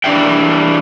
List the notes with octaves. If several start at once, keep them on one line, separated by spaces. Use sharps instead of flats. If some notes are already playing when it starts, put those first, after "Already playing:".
E3 G3 D4 G4 E5 G5